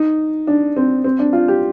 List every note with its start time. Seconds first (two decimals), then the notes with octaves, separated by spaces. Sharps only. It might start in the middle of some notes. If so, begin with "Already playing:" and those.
Already playing: D#4
0.47 D4
0.76 C4
1.04 C4
1.19 D4
1.33 F4
1.48 G4